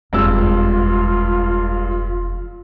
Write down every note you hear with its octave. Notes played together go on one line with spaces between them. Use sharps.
F1 E2 G2 G#3 F4 E6